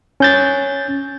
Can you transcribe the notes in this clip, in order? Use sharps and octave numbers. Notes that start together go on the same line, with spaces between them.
C#4 G6 A6